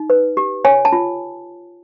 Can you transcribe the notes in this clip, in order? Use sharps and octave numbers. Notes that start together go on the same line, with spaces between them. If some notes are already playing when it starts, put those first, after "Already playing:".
Already playing: D#4
B4
G4
C#5 G#5
A5
F4